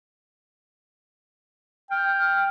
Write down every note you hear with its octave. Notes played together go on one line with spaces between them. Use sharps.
G5 F6